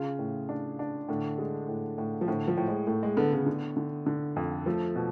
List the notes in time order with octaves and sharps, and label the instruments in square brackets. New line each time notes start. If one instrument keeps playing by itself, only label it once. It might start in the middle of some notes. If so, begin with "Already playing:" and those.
Already playing: [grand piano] C#3 [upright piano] F4
[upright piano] A2
D4
D4
[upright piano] A2 [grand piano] D3
[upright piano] G#3
A2
A2
[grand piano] F3
[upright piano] A2 [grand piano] D3
[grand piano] F3
[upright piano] A2
[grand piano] G#3
[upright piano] A2 [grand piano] A3
[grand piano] G#3
[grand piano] D3 [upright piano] B3
[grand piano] C#3
[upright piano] D3
D3
D3
F2
[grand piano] F3 [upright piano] A3
[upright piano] B2